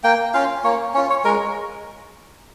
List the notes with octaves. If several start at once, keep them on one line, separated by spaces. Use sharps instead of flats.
A#3 G5
C#4 F4 F5
A#3 C#5
C#4 F4 C#5
C#5
G#3 A#4